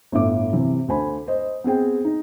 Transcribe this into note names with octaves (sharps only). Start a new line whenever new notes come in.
G1 A2 E5 D6
C3 E3
D2 C5 G#5 B5
C5 D#5
B3 C4 G#4 G5
D#4